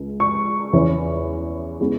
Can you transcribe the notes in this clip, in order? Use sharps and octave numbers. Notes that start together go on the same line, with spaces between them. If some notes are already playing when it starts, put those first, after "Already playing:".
Already playing: C#2 C#3 G#3
C#6
E2 E3 C#4
C#3 G#3 B3 E4